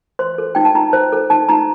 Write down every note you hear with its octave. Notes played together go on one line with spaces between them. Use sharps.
C5 C6
A4
D#4 G5
A5
D#4 A#5
C5
A4
D#4 A5
D#4 A#5